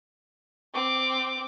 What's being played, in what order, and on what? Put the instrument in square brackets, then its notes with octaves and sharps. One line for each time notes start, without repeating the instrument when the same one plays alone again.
[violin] C4 D6